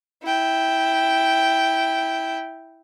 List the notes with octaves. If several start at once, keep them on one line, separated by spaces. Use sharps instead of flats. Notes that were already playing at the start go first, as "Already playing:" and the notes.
E4 G5